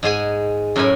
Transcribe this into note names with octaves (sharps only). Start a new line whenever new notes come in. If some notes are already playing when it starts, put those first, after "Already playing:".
G#2 G#3 G#4 G#5
F#2 A2 A#4 E5 G#5 B5